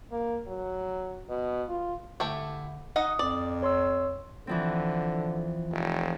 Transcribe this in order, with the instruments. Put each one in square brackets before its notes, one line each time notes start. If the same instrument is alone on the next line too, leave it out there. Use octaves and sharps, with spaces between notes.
[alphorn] A#3
F#3
B2
F4
[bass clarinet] D3 [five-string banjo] A3 E4 G4
[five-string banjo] D#4 D#5 F#5 [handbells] D#6
[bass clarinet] F2 [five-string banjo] D5
[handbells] C#5 C6 E6
[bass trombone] D3 [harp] E3 F3 C4
[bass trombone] F1